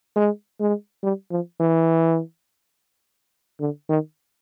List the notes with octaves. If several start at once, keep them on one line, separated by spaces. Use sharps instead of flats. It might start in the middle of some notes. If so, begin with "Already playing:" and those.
G#3
G#3
G3
F3
E3
D3
D#3